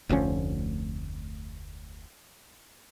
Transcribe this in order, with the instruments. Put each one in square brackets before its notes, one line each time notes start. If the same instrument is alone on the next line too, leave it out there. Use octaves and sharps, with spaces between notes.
[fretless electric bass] F1 D2 F3 C#4